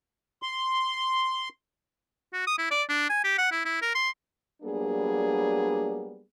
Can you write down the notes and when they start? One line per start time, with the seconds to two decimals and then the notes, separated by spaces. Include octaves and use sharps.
0.42 C6
2.33 F#4
2.47 D#6
2.58 E4
2.71 D5
2.89 D4
3.10 G#5
3.24 G4
3.38 F#5
3.51 E4
3.65 E4
3.82 A#4
3.95 C6
4.62 F#3 G3 A#3 B3 D4 G#4